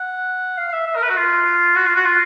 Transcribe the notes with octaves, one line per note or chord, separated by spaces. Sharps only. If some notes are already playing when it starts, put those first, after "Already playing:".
Already playing: F#5
F5
F5
E5
E5
A#4
B4
F#4
F4
F#4
F4
F#4
F4